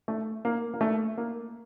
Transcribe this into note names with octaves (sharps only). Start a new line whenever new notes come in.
A3
A#3
A#3
A3
A#3